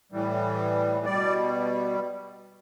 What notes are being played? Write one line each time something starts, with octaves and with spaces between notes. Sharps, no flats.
A2 E3 G3
B2 G3 D5